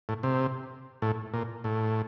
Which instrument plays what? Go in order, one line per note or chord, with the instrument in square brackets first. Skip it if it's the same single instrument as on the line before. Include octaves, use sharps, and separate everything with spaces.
[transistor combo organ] A2
C3
A2
A#2
A2